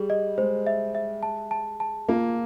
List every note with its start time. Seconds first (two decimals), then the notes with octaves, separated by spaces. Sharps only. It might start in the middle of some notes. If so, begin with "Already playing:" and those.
Already playing: G3 G#4
0.10 D#5
0.38 G#3 C5
0.67 E5
0.95 E5
1.23 A5
1.51 A5
1.80 A5
2.09 A#3 F4